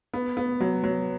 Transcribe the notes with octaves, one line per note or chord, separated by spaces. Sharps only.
B3
B3
F#3
F#3